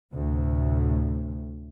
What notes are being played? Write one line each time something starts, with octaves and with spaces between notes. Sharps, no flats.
D2 A2 C3